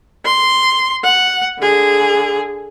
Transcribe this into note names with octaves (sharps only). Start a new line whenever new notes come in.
C6
F#5
D3 G#4